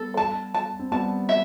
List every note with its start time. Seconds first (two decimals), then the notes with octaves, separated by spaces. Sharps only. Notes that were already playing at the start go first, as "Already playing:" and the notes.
Already playing: G3 B3 A4
0.17 A5
0.54 A5
0.79 C4
0.92 G3 B3 A5
1.29 E5